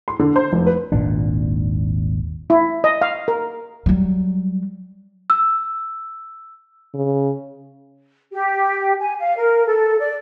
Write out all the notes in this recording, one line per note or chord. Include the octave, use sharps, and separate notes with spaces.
C6
D3
C5
F1
B4
D#1 G#1 A#2 D4
E4
D#5
F5
A#4
F#3 G3
E6
C#3
G4
G#5
F5
A#4
A4
D5